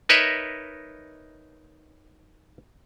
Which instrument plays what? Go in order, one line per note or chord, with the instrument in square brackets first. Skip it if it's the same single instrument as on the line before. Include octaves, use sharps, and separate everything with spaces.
[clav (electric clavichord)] D#4 A#4 B4 C#5 D#5 E5